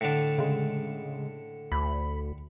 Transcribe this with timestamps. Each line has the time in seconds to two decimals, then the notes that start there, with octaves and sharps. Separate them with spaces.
0.01 A2 D3 D4
0.38 C#3 G#3
1.72 D2 B5